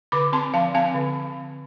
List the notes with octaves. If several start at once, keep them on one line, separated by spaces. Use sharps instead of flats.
D3 B5 D6
C4 A5 C6
F3 F5 A5
C4 F5 A5
D3